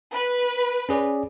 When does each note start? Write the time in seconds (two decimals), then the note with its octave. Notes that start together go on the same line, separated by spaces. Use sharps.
0.13 B4
0.89 C#4 G#4 D5